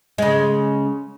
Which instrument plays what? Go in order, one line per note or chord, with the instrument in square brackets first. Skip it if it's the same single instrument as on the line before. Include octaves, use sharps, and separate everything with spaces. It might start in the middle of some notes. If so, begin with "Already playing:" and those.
[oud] C#3 G#3